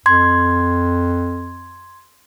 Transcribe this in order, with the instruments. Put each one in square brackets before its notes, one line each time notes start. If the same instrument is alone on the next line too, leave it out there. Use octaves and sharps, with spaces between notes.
[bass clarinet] F2 [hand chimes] C6 G#6